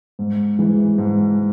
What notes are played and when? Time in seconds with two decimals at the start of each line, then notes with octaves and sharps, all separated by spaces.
0.19 G#2
0.59 E3 G#3
0.98 G#2